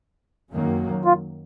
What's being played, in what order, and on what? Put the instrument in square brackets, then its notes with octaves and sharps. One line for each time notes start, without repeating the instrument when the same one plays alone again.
[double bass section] F#2 D#3 F#3 A#3
[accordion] F4